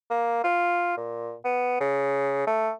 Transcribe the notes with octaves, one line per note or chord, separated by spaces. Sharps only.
A#3
F4
A#2
B3
C#3
A3